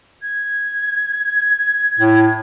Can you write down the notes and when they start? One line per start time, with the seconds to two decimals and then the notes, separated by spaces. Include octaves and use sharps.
0.22 G#6
1.99 A2